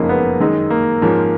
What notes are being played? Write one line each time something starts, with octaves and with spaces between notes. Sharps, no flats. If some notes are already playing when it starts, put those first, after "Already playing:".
Already playing: F#1 F2 C#3 G#3 A#3 D#4
B3
F#2 D#3 G#3 D#4
A#3
G#2 F3 A#3 C#4 G#4